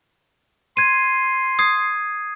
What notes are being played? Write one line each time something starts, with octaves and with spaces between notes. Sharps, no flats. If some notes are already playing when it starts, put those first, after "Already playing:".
C6 G#6 D#7
D#6 G#6 C7